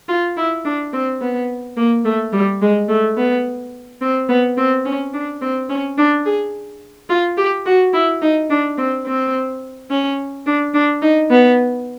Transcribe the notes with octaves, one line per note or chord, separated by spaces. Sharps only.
F4
E4
D4
C4
B3
A#3
A3
G3
G#3
A3
B3
C4
B3
C4
C#4
D4
C4
C#4
D4
G#4
F4
G4
F#4
E4
D#4
D4
C4
C4
C#4
D4
D4
D#4
B3